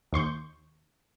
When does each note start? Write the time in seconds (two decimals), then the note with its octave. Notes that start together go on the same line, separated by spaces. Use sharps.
0.12 D#2 C6 C#6 G6